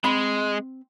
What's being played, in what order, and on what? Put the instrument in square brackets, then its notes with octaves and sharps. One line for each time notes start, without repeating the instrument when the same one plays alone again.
[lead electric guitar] G#3 [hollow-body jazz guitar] C4 F#5 B5